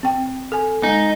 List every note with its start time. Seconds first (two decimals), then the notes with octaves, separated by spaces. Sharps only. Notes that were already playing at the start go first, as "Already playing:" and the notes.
0.03 C4 G5
0.52 A4 G#5
0.83 G#3 D#4 G#5